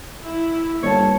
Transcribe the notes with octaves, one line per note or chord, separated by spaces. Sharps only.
E4
G1 A#3 C#5 A5